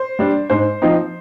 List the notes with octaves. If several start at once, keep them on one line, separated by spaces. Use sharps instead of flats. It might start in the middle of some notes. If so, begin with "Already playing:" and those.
Already playing: C5
G3 D4
G#2 C5
F3 C4 D#4